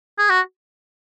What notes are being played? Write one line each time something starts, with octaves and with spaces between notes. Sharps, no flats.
G#4
F#4